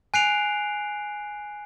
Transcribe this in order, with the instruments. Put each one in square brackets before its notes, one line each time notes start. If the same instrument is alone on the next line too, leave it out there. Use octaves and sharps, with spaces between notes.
[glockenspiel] G#5 F#6 C7 D7 F7